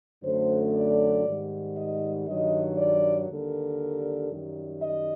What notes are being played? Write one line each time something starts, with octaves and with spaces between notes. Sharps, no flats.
F#2 D3 F#3 A3 C5
D5
G#2 D#3 G3
D#5
G2 D#3 F#3 D#5
D5
D#2 D3 G3 A#4
F#2 D#3 G3
D#5